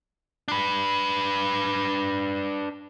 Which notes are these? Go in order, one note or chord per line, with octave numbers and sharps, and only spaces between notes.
D4 B4